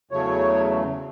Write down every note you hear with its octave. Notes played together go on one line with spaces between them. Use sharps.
E2 C#3 F#3 A3 C#5